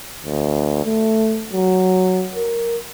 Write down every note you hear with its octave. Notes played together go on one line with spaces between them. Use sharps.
D2
A3
F#3
A#4